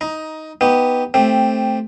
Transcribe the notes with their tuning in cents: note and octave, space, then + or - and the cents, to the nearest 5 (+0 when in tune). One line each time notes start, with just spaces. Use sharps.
D#4 +10 A#5 +20
B3 +0 D#4 +10 G4 +0
A3 +0 C4 +5 G4 +0